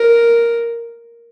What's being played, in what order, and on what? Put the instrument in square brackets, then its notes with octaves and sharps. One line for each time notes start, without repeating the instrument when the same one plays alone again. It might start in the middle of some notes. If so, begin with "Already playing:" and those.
Already playing: [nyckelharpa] A#4